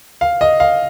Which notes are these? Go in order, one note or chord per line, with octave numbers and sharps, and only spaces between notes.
F5
D#5
F5